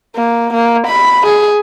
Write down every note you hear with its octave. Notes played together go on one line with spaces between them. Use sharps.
A#3
A#3
B5
G#4